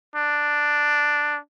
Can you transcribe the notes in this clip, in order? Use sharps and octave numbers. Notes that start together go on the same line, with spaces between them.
D4